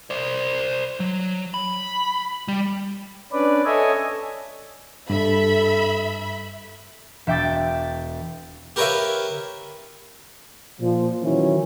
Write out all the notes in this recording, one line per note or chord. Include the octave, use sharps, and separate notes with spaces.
C5 D5
F#3
B5
G3
C#4 D4 B4 D5
A4 C#5 D#5 E5 G#5
G2 A4 E5 B5
E1 E5 G5 D6 A6
G4 A#4 B4 C#5 E5 F5
A#2 F3
D#3 E3 F#3 C#4 E4